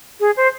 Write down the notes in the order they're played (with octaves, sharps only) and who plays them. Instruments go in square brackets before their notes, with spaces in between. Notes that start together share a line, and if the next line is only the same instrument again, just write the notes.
[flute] G#4
C5